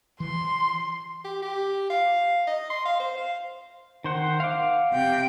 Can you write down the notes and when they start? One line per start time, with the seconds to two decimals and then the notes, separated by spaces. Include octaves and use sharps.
0.20 E3 C6
1.24 G4
1.42 G4
1.90 F5
2.47 D#5
2.70 C6
2.85 F5
3.00 C5
3.17 F5
4.04 D#3 C5 F#5
4.40 F5 F#5 D6
4.91 C3 G5